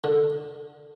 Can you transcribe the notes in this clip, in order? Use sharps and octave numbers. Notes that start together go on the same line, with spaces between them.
D3